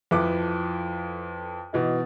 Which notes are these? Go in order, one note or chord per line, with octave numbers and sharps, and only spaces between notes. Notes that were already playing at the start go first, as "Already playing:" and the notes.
F2 E4 A4 B4 D6
B2 E3 D#4